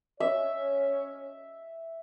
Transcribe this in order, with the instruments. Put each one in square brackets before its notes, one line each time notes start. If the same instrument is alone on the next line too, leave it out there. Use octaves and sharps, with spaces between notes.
[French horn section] C#4 C#5 [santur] E5